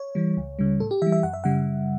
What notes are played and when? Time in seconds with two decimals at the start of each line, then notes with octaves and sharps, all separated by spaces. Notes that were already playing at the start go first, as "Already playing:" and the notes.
Already playing: C#5
0.15 E3 G3
0.37 C#2
0.59 C#3 G3
0.80 A2 A4
0.91 G4
1.02 E3 G3 E5
1.12 E5
1.23 F#2 F#5
1.33 E5
1.44 C#3 G3 F#5